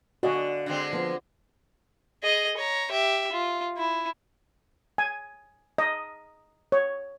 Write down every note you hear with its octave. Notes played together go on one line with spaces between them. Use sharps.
D3 F#4 D5 D#5 F5 G#5
D3 G#3 C4
F3 B3 C5
G#4 D#5
C#5 A#5
G4 E5
F4
E4
G#5
D#5
C#5